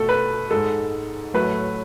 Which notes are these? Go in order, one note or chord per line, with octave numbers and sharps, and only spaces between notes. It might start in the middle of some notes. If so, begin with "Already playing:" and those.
Already playing: B2 A3 A4
B4
G#2 G#3 A4
A2 F#3 A3 B4